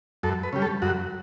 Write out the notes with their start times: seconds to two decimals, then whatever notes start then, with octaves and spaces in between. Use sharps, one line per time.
0.23 F#2 A4
0.43 B4
0.53 C#3 G3
0.62 A4
0.82 F#2 F#4